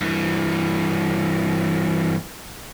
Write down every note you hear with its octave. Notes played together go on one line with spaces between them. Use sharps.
G2 E3